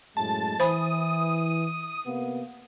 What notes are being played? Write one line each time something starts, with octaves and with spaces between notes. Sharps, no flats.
F#2 A2 G#3 A5
E3 C5 G#5 B5 D#6
C3 A#3 B3